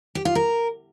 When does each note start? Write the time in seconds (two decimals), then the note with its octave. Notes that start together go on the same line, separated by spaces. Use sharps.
0.15 G4
0.25 F4
0.35 A#4